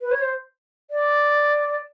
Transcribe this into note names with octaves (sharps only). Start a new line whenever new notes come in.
B4
C#5
C5
D5